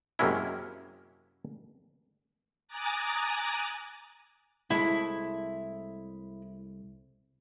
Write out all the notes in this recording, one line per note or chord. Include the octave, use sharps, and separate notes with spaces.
F#2 C3 G#3 A#3 C#4 E4
G#5 A#5 D6 D#6 F#6 A6
C2 G#3 A3 E4